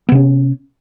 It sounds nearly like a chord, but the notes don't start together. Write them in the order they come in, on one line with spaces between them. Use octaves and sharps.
B3 C3 C#4